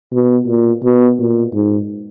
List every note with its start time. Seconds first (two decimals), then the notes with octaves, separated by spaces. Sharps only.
0.13 B2
0.47 A#2
0.84 B2
1.19 A#2
1.54 G#2